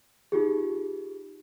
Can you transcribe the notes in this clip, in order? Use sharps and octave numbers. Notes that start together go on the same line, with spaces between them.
D#4 F4 G4 G#4